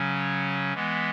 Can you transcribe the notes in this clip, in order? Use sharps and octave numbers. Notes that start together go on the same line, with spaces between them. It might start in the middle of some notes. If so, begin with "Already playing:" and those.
Already playing: C#3 F#3 C#4
E3 G#3 B3